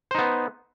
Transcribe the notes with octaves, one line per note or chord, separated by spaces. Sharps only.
B3 D#4 C5